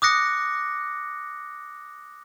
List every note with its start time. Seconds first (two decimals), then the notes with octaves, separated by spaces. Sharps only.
0.02 D6 D#6 F#6 A#6 C#7